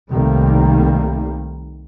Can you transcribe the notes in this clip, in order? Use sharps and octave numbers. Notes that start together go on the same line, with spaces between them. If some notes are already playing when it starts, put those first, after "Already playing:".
C2 D#3 G3 A3 A#3